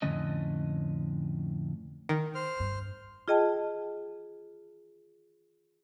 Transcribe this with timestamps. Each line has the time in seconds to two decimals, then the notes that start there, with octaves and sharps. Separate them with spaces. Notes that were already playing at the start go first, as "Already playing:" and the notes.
0.02 F2 A2 D3 C#4 D#5
2.09 D#3
2.35 C5 F6
2.60 G2
3.28 F4 G#4 D#5 G5 A5